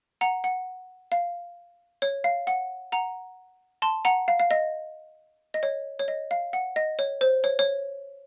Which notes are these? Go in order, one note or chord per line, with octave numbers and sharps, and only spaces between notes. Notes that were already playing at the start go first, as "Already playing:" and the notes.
F#5 A#5
F#5
F5
C#5
F5
F#5
F#5 A#5
A5 C6
F#5 A#5
F5
F5
D#5
D#5
C#5
C#5
D#5
F5
F#5
D#5
C#5
C5
C#5
C#5